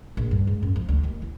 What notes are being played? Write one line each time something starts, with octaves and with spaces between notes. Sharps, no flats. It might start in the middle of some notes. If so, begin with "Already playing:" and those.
A#1
G2
G#2
F#2
F3
D2
D#2
E4